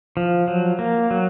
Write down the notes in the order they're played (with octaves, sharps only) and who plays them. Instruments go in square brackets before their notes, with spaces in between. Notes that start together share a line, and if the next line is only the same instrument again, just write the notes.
[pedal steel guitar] F3
F#3
A#3
F#3